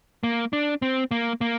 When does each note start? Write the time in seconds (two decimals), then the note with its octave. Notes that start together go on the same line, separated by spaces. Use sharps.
0.23 A#3
0.53 D4
0.82 C4
1.11 A#3
1.41 A#3